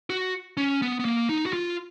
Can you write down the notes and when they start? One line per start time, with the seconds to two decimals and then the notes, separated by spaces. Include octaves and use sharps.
0.10 F#4
0.57 C#4
0.82 B3
1.00 B3
1.05 A#3
1.29 D#4
1.46 F#4
1.53 F4